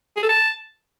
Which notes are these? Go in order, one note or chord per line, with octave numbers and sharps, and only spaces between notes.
G#4
A4
A5